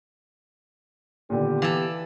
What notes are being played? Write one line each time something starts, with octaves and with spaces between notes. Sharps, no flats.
A#2 D3 D#3 B3 G4
E3 A4 F5 D6 E7